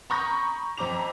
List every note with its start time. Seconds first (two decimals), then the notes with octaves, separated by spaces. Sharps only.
0.10 A#5 B5 C#6 D#6 G6 A#6
0.77 F2 C4 A#5 D6 F7